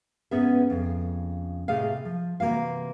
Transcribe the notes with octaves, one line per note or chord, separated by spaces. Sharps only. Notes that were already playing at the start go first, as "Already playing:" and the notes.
G#2 B3 C#4 G#4 B4 E5
F2 C#3
A2 C3 A3 G#4 D#5 F5
F3
C3 E3 A#3 F#4 F5